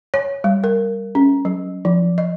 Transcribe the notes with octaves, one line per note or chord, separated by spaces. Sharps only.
C#5
G3
A#4
C#4
F#3
F3
D#5